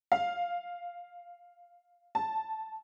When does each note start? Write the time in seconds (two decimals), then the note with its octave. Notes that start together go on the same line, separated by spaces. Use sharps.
0.12 F5
2.15 A5